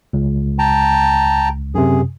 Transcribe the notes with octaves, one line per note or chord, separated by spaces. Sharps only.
C#2
G5 A5 A#5
F#2 C3 G#4